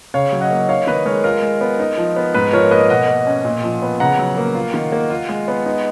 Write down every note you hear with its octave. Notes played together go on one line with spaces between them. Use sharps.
C#3 C#5 F5
F#3
D#5 F#5
A#3
D#4 C#5 F5
D#3 B4 D#5
G#3 A#4 C#5
F4 A#4
G#3
B3
D#4
F3
B3
G#2 B4
F3 A#4 C#5
A#3 B4 D#5
B2 D#5 F#5
A#3
C#4
A#2
F3
B3
C#3 F#5 A#5
F#3
A#3
F4
D#3
A#3
F4
G#3
B3
D#4